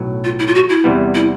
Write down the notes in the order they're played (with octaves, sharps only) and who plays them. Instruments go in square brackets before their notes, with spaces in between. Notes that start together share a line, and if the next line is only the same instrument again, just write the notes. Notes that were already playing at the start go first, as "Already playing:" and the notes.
Already playing: [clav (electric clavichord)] B1 A2 F#3
[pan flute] F4
E4
F4
F#4
E4
[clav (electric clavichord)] E2 C3 E3 G3 B3
[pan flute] E4